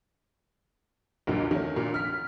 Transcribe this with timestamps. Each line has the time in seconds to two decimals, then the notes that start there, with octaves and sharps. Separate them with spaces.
1.27 B1 E2 G2 A#2 D3
1.51 D#3 A3 C#4
1.76 A#2 D3
1.93 A#1 F6 B6